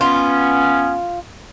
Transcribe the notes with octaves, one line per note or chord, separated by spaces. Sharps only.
B3 C#4 F4